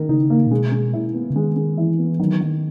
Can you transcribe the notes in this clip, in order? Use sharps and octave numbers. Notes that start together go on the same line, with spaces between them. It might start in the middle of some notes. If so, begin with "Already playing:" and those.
Already playing: D#3 A#4
C#3 D#4
A#3
A#2
B2 G#3
G#3
E4
B3
C#3
D#3 G#3
G#3
E3 E4
B3
D#3 F#3
D#3